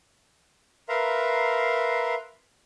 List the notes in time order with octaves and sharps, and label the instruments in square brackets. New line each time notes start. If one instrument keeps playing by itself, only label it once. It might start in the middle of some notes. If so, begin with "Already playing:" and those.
[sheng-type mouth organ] A#4 B4 E5 F5 A#5 C6